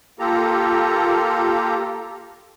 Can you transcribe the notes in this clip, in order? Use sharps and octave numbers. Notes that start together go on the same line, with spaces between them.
A#3 F4 G4 A4 A#5